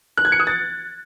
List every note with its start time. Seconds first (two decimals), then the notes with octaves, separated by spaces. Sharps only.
0.17 F#6
0.25 G#6
0.32 C#7
0.40 D#6
0.47 A6